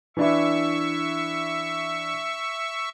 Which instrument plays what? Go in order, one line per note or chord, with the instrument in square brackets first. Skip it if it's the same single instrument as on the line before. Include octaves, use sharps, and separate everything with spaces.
[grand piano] E3 D4 E4 [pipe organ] E5 C#6